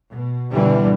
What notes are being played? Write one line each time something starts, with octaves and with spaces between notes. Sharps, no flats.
B2
B2 D3 E3 G3